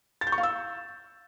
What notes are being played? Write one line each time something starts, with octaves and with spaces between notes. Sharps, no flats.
A6
G6
C#6
F5
E6